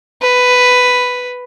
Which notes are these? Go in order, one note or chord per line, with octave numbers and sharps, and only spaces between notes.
B4